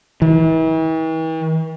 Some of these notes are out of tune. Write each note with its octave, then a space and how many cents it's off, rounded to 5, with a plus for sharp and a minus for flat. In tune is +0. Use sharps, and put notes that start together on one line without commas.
E3 -40